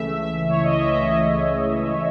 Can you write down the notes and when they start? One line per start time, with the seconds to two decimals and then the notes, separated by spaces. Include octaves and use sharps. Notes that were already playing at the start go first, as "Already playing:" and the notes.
Already playing: C#2 C#3 E3 A3 E5
0.19 E5
0.49 C#5
0.64 D#5
0.78 E5
0.93 E5
1.08 D#5